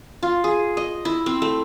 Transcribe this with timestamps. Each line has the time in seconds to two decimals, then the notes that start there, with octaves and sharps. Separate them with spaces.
0.23 F4
0.44 G#4
0.77 D#5
1.05 E4
1.26 C4
1.42 A3